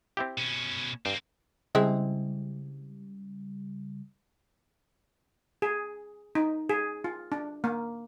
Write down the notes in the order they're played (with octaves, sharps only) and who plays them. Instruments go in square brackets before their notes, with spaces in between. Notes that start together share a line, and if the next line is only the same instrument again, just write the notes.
[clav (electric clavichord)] C4 E4 G4
[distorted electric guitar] B2 C#4
[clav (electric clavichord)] G2 [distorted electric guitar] A#3 C4
[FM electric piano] C#3 G3 [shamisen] G#3 C4 E4
[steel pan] G#4
D#4
G#4
F4
D4
A#3